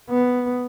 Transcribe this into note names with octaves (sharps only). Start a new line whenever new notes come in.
B3